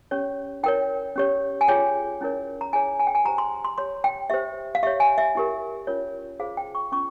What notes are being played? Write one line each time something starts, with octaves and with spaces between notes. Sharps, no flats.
C#4 G4 C#5
E4 A#4 C#5 G5
C#4 G4 C#5
G#5
F4 G#4 C#5 G5
C#4 E4 A#4 C#5
A#5
E4 G#4 C#5 G#5
G#5
G5
G#5
G4 C5 A#5
C6
C6
G4 C#5 C6
G5
G4 C5 E5
F5
G4 C#5 E5
G#5
E5
E4 G4 A#4
C#4 F4 A#4 C#5
F4 G#4 C5 F5
G5
C#6
C#4 F4 C#6